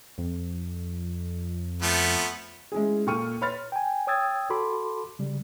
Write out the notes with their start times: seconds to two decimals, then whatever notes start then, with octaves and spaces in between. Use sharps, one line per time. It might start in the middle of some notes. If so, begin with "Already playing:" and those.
0.18 F2
1.82 F3 A3 B3
2.72 G#3 C#4 E4 G#4
3.07 A#2 A4 G5 C#6 F6 D#7
3.41 B4 C#5 B5 C6 F6 A6
3.72 G5 G#5
4.07 C#5 G5 D#6 E6 G#6 A6
4.50 F#4 A4 A5 B5 C6 D6
5.19 C#3 G3